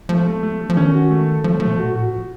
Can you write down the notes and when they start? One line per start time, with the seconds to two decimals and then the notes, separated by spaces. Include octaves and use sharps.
0.09 F3 A3
0.26 A3
0.43 A3
0.60 A3
0.70 F3
0.77 D#3 C#4
0.94 F#4
1.11 A3
1.28 A4
1.44 F3 A3
1.52 F#3
1.60 F3 A3
1.67 A#2
1.78 F#4
1.89 A2
1.95 F#4
2.12 F3